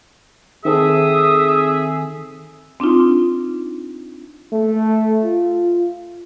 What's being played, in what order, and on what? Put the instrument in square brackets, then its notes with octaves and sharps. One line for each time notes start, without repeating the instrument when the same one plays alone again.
[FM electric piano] D#3 C4 A4 [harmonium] G#4 [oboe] E5 [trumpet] D#6
[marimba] C4 D4 D#4 F4
[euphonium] A3
F4